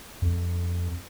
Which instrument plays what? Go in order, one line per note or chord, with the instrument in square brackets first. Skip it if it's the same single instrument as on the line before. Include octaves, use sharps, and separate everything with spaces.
[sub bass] F2